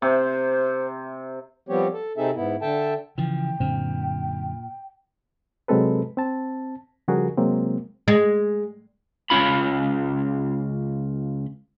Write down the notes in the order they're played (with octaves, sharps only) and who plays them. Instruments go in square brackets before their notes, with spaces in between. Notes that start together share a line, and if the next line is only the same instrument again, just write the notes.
[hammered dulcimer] C3 [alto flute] C5
[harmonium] F3 G3 B3 C4 G4 C#5
A4
C3 C4 D#4 G#4 A4 E5
G#2 B3 E4
D3 A4 E5 G5 A5
[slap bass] C#3 F3 [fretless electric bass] E3 [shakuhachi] G5
[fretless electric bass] F#2 D3 C4 [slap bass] A#2
[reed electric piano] C3 F#3 G#3 C4 A4 B4
C4 A5
C#3 F3 G3 F#4 G#4 A#4
C3 F#3 G#3 A#3 C4
[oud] G#3
[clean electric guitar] C#2 C#4 F4 B5